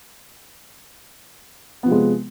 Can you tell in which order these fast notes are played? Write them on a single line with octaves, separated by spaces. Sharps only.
B3 F3 C3 G#3